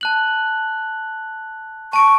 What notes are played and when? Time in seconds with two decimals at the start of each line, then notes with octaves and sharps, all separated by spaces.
0.01 A5 F#6 F#7
1.93 A5 C#6 D7